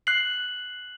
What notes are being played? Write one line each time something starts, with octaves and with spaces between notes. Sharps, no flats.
F#6 C7 F#7